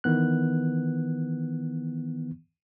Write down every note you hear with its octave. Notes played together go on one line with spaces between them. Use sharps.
D#3 E3 B3 F#6